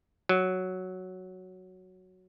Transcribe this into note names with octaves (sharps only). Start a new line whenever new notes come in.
F#3